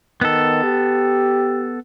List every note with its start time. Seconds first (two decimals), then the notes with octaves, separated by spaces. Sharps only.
0.21 D#3 B3 A4
0.63 G4